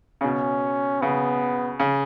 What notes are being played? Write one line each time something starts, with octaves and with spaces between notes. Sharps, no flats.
C#3
B2 C#4
C#3 B3
C#3